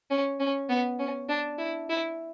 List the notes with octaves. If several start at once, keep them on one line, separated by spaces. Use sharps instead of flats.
C#4
C#4
B3
C#4
D4
E4
E4